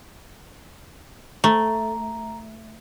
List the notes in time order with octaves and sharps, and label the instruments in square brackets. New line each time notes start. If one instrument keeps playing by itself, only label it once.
[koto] A3 [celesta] A#5